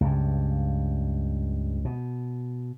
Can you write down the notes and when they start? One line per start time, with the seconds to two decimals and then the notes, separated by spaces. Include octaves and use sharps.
0.01 C#2 G2
1.85 B2